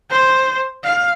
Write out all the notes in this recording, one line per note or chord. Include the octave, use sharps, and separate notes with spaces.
C5
F5